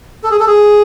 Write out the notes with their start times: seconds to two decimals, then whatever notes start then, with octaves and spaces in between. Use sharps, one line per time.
0.24 A4
0.31 G#4
0.40 A4
0.47 G#4